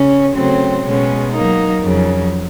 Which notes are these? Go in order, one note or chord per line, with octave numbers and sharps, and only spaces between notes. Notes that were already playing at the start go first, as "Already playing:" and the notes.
Already playing: C#3 C#4
C#3 F#3 A3 C4
B2 G#3 C#4
F#3 A#3 D#4
F2 C#3 F#3